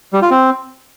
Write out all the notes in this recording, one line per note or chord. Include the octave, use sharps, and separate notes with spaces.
G3
F4
C4